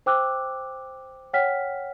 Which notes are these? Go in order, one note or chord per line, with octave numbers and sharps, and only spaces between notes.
C5 G5 D6 E6 F#6
C#5 F#5 G5 F6 B6